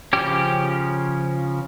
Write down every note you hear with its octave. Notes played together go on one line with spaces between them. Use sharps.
C#3 F3 C#4 G4